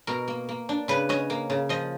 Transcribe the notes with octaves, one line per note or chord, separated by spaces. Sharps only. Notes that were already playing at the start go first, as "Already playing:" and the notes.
B2 A#4
A#3
A#3
D4
C#3 B4
C#4 D#5
A#3
C#3
F3 D#5